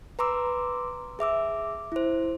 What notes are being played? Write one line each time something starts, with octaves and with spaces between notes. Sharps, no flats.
B4 A#5 C6 D6 E6
G#4 E5 D6 E6
E4 C5